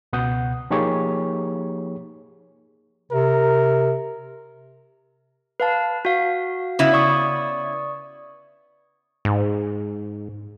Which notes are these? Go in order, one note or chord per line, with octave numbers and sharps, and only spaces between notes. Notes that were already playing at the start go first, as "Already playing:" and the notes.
C#2 B2 F#5 D#6 G6
F3 A#3 D#4 G4 G#4 C#5
C3 A#4
B4 F5 A5
F#4 F5
C#3 B3 E4
D5 C#6 D#6
G#2